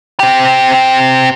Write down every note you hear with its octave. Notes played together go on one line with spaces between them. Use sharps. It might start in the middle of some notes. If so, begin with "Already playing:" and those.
C4 G4